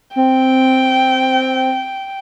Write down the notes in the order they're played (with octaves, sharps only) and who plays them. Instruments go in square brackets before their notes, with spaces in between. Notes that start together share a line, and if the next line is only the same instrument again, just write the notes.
[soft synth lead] C4 [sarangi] G5